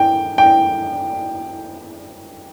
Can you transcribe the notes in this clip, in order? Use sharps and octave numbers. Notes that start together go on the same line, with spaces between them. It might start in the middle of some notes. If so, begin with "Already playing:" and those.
Already playing: G5
G5